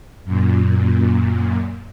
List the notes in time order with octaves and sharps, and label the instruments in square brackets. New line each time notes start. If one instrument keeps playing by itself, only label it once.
[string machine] F#2 A#2